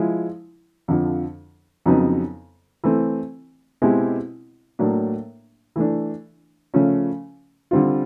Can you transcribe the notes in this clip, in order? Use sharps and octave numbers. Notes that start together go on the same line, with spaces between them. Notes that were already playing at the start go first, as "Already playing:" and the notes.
Already playing: F3 G#3 E4
F2 D3 F3
F2 C#3 F#3 B3 D#4
E3 A3 C4
B2 G#3 C4 E4 G4
A2 F#3 A#3 D4
E3 A3 D4
C#3 F3 A3 C#4
D3 G3 C4 F4